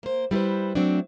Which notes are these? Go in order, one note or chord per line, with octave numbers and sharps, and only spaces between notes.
A#3 C5
G3 E4 G#4 B4 C5
F#3 A3 C4 D4